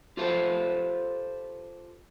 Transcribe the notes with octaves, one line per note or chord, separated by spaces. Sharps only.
F4 G4 A4 B4 C5 F5